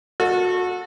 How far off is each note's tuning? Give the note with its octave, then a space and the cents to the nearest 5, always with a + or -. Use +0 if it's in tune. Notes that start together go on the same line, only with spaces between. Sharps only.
F#4 -25 A4 +0